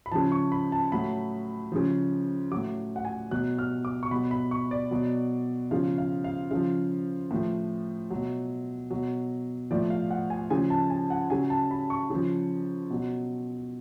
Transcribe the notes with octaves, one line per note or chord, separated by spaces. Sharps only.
B5
C#3 F3 A5
C#6
B5
A5
A2 F#3 B5
C#3 F3
A2 F#3 D6
F#5
G#5
B2 F#3 F#6
F6
D6
C#6
B2 F#3 B5
B5
C#6
D5
B2 F#3
C#3 F3 F5
F5
F5
C#3 F3 F5
A2 F3
B2 F#3
B2 F#3
A2 F3 D5
F5
F#5
G#5
C#3 F3 G#5
A5
G#5
F#5
C#3 F#3 G#5
A5
B5
C#6
C#3 F3
B2 F#3